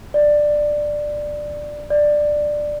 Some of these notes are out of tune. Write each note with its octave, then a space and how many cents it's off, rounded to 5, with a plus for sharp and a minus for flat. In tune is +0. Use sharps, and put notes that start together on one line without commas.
D5 +10
D5 +10